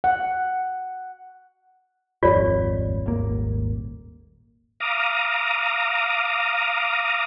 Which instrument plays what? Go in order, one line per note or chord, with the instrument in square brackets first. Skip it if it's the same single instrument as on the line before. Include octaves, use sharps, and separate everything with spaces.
[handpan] F#5
[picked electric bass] D#1 G#1 F2 [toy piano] F4 C#5 D5
[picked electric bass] D#1 G#1 A#3
[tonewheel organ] F5 A#5 D6 D#6